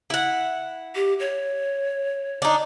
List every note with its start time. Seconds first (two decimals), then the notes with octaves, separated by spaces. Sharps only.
0.10 E4 F#5
0.95 G4
1.20 C#5
2.42 D4 D#4